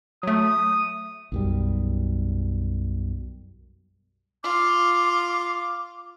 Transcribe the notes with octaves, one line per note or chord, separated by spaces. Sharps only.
F#3 A3 D#6
B1 F#2 G3
F4 D6